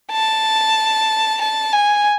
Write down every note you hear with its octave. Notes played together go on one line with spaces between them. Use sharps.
A5
A5
G#5